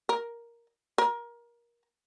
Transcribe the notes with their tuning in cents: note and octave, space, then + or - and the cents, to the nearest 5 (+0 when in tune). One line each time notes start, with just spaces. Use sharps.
A#4 +5
A#4 +25